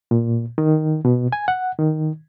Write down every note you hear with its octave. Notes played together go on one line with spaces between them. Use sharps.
A#2
D#3
B2
G#5
F#5
D#3